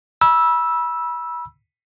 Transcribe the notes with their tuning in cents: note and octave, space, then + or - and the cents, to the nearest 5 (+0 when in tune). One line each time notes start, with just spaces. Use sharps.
B5 -30 E6 +0